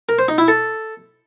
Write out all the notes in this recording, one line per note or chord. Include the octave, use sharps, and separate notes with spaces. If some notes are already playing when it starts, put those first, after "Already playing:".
A#4
C5
D#4
E4
A4